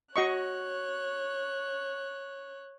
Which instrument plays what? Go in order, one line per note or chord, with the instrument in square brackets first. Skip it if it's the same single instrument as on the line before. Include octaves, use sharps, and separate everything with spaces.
[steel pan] F#4 D#5 C#6 [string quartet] C#5 F#6